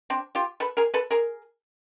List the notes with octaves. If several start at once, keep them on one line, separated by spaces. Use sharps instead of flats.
C4 D4
F4 G4
A4 B4
G#4 A#4
A4 B4
G#4 A#4